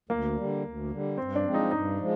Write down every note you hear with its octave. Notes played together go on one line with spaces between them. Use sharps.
D2 A#3
D3 G3
D2
D3 G3
G2 C4
D4
F3 G#3 C4
D#4
G2 D#4
F3 G#3